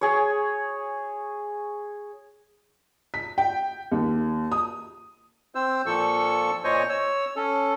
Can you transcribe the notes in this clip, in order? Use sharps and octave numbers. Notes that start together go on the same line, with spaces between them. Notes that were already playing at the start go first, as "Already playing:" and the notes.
G#4 C#5
B6
G5
D#2
D#6
C4 C5 E6
A#2 F3 A4 C#6 E6
A#2 C5 C#5 D#5 G#5 C#6
C#5 E6
C#4 A4